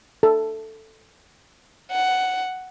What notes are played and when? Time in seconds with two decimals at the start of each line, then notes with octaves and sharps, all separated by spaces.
0.23 A4
1.91 F#5